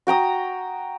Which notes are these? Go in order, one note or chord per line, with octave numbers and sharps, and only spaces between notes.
F#4 G5 A#5 D#6